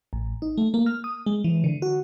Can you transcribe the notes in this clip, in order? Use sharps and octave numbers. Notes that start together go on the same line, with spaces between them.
A1
D#4
A3
A#3
F6
D#6
G#3
E3
D3
F#4